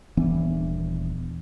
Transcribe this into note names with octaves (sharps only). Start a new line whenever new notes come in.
D#1 E3 B3 D4